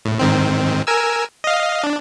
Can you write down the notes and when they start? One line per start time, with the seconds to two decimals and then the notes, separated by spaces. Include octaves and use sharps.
0.05 A2
0.20 G#2 D#3 C4
0.87 A#4 G#5 E6
1.44 D#5 F5
1.84 D4